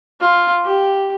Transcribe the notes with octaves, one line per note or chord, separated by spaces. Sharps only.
F4
G4